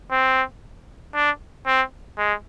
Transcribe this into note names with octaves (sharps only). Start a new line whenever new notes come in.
C4
D4
C4
G#3